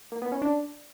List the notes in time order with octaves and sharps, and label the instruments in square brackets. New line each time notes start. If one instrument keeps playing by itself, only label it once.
[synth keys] A#3
B3
C#4
D4